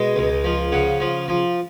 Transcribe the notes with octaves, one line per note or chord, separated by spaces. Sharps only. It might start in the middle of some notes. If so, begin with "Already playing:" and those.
Already playing: B2 G#3
C#2
F3
C#3 F#5
F3
F3